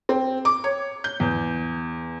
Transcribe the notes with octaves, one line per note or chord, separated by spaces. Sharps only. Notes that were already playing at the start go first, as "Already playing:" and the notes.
C4
D6
C#5
G6
E2